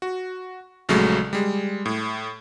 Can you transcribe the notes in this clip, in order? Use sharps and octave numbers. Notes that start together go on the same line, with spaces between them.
F#4
A#1 C#3 F#3 G#3 A3
G3 G#3
A2